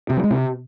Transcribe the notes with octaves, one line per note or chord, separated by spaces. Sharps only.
C3
F#3
G#3
C3